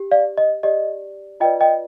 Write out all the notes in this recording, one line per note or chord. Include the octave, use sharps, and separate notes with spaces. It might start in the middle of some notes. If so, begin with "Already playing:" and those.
Already playing: G4
D5 F5
D#5
G4 D5 D#5
F4 B4 D5 D#5 G5
D#5 G5